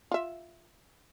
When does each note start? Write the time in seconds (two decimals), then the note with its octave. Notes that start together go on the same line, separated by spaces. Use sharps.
0.12 F4 E5